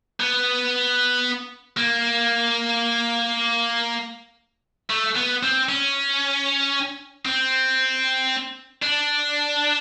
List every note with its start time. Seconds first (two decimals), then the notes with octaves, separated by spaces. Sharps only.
0.20 B3
1.77 A#3
4.90 A3
5.16 B3
5.43 C4
5.69 C#4
7.25 C4
8.82 D4